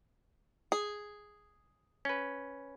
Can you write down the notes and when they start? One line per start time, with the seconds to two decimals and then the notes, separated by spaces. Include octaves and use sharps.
0.72 G#4
2.05 C#4 B4